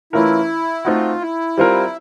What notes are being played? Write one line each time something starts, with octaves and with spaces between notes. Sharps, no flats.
E3 A3 C#4 E4 F4 A#4
A3 C4 D#4 F4 F#4
E4
G3 C4 F4 A#4